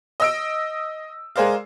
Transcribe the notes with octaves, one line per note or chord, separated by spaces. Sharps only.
D#5 E6 D7
G#3 G#4 A#4 C5 D5 F5